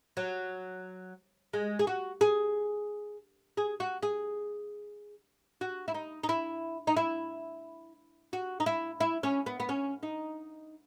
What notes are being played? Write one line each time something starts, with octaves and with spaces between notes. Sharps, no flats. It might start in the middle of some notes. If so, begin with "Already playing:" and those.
F#3
G#3
G#4
F#4
G#4
G#4
F#4
G#4
F#4
E4
D#4
D#4
E4
D#4
E4
F#4
D#4
E4
E4
C#4
B3
B3
C#4
D#4